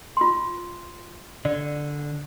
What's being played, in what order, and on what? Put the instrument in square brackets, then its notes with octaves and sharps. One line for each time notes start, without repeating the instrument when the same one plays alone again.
[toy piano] F4 C6
[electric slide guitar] D3 [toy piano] D5